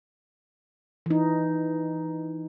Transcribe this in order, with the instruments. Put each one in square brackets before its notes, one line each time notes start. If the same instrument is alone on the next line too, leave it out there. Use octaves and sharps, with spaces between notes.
[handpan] E3 D#4